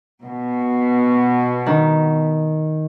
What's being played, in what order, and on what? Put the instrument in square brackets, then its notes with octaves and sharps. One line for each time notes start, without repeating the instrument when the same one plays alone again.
[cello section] B2
[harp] D#3